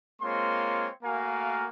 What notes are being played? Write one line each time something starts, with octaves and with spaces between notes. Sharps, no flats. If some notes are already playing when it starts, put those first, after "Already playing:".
G#3 A#3 C4 F4 C#5 C6
A3 A#3 F#4 A#4 F5 G#5